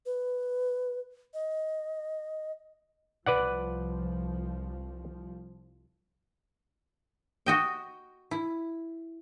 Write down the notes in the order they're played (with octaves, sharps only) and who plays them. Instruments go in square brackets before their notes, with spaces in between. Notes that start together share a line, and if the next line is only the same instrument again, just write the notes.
[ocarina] B4
D#5
[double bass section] C2 F3 [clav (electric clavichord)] B4 D5 F#5
[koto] F#4 D#5 G5
E4